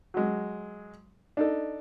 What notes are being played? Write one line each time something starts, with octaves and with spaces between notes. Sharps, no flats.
F#3 G#3
D4 D#4 A4